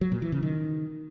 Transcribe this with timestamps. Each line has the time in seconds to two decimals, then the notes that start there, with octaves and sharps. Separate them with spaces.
0.01 F#3
0.12 A#2
0.22 E3
0.32 C#3
0.43 D#3